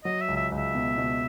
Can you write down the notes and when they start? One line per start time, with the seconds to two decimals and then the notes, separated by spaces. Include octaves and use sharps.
0.05 F#3 D#5
0.21 E5
0.28 C#2
0.37 E5
0.52 C#2
0.57 E5
0.75 B2
0.98 B2